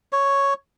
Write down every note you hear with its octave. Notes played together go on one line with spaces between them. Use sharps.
C#5